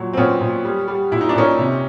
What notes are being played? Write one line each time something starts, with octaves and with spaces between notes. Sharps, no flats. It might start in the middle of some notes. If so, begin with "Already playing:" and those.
Already playing: A#2 F#3
C4
A#2 B3 C#4
A#2
G3
G3
A#2 E4
D#4
D4
A#2 C#4 D#4
C3